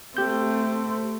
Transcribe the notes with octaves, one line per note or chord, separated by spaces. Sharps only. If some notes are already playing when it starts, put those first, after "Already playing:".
A3 C4 G4 G6